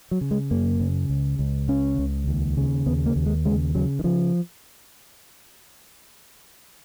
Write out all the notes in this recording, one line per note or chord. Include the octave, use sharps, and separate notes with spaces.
F#3
C#3
G#3
F#2 A#3
C#3
C#2
C#2
C#3 C#4
C#2
D#2
C#3
D#2 B3
A#3
D#2
G#3
C#3 G#3
C#3 F#3
D#3
C#3 F3